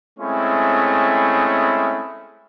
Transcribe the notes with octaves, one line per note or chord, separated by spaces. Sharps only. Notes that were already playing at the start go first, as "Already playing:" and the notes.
G#3 A3 C4 C#4 E4